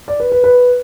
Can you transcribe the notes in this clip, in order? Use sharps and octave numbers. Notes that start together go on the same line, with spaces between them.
D5
B4
B4
B4